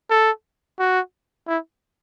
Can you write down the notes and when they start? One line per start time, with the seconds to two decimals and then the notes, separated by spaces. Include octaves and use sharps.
0.10 A4
0.79 F#4
1.47 E4